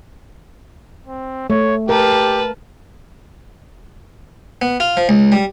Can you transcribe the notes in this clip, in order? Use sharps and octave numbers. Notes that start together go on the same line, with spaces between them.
C4
A3 C#5
G4 A#4 B4 A5
B3
F4
F3
C#2
G3